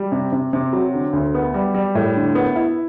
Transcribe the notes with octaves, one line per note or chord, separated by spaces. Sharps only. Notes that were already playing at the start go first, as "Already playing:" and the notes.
Already playing: G3
C3
C3
C3
F#3
D3
D2
B3
G3
G3
A2
D3
B3
E4